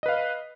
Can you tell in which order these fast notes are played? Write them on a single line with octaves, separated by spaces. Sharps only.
D#5 B4 F5